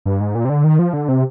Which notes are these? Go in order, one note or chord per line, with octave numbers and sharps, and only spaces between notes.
G2
G#2
A#2
C3
D3
D#3
F3
D3
C3